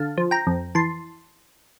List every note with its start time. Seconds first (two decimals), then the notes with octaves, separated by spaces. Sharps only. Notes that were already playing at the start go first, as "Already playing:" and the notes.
Already playing: D3 F5 A5
0.18 F3
0.31 G5 A#5
0.47 F2
0.75 E3 A5 C6